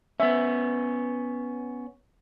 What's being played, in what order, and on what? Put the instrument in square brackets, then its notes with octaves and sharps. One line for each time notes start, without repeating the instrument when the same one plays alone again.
[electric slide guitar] B3 C#4 [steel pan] E5